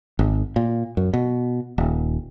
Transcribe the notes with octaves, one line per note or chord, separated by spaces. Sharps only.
G#1
A#2
F#2
B2
D#1